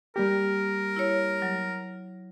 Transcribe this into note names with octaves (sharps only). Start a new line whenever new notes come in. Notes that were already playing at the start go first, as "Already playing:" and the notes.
G3 A#3 G4 A#4
E4 C#5
F#3